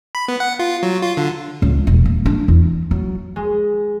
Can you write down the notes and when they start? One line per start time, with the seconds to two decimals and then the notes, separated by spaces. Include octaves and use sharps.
0.15 B5
0.28 B3
0.40 F#5
0.59 F4
0.83 F#3
1.03 F4
1.17 D3
1.62 C#2
1.87 E1
2.05 A#3
2.26 D4
2.48 E2
2.91 F#3
3.36 G#3